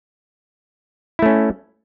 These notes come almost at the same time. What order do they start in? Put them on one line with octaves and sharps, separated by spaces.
E4 A3 C#4